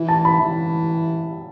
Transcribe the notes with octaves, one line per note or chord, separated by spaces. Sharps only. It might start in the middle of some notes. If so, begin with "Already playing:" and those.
Already playing: E3
A5
B5
E3